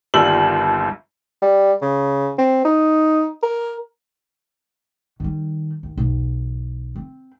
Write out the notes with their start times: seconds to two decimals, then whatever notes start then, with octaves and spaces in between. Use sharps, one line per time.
0.14 G1 D#2 G3 F4 E6 F#7
1.42 G3
1.82 C#3
2.38 C4
2.65 D#4
3.43 A#4
5.20 D#3 G3
5.83 D#2
5.97 B1 E2
6.96 C4